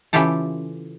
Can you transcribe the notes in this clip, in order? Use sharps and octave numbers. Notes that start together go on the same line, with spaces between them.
C#3 E3 E4 F4 G4 A4